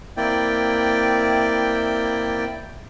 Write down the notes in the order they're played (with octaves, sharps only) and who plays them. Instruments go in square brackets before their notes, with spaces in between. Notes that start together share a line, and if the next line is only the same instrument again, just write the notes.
[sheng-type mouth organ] A#3 C4 E4 D5 G5